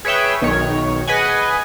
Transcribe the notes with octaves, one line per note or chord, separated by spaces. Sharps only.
G#4 B4 C#5 E5 G5
B1 D#3 C#5
G#4 B4 D#5 F#5 G#5